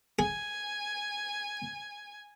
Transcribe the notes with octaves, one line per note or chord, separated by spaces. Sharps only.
G#4 G#5